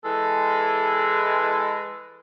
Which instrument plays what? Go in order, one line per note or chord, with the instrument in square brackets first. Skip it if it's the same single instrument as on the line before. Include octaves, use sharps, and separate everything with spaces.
[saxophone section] E3 G#3 [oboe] A4